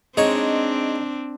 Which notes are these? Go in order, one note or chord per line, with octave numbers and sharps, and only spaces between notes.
G#3 C4 D4 D#4 C#5